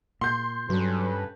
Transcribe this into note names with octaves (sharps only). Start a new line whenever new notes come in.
A#2 C6 G6
G2 F#3 C#4 A4 B4